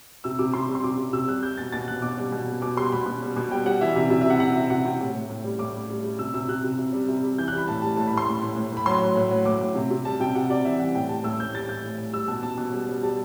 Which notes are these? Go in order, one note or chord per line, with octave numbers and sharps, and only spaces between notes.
C3 E6
C3 D6
C3 C6
G3
C6
C3 D6
C3
C3 E6
G3 F#6
G3 G6
B2 A6
B2 A6
B2 F#6
B2 D6
G3
B2
G3
B2 D6
G3 C6
B2 B5
B2
G3
B2
G3 G5
G3 F#5
E3 E5
C3 E5
C3 E5
E5
C3 F#5
C3 F#5
C3 E5
C3 F#5
C3 G5
A2
A2
A2
G3
A2 D6
G3
G3
G3
C3 E6
C3 E6
C3 F#6
C3
C3
G3
C3
G3
E3 G6
F#6
G3
B5
A2 A5
G3 A5
A2 A5
B5
A2
C6
A2
A2
A2
A2 B5
F#3 C6
F#3
A2
F#3
A2 D6
A2
C3
C3
G3 A5
C3 G5
C3 F#5
C3 D5
E3 E5
G3 F#5
A2 G5
G3 A5
A2 E6
A2 G6
G3 A6
A2 G6
A2
A2
G3 E6
B2 A5
B2 A5
B2
G3
G3
G3 A5